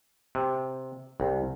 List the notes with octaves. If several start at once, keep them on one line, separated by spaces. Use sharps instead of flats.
C3
C2